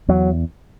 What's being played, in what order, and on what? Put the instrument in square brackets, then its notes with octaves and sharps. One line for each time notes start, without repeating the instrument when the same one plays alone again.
[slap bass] E2 F#3